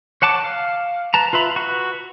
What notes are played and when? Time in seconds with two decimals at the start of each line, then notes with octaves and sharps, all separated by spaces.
0.22 C#5 F#5 A5 D6
0.44 F5
1.14 B4 A5 A#5
1.33 F4 B4 E5 B5
1.56 F#4 B4